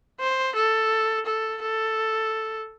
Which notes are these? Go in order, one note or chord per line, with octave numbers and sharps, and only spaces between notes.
C5
A4
A4
A4